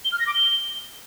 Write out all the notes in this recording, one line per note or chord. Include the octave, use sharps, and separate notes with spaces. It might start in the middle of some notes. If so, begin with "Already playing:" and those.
G7
F6
A#6
D6
G7